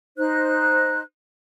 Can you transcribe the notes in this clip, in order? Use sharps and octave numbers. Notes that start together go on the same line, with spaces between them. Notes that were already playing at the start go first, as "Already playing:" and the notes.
D#4 C5 F#6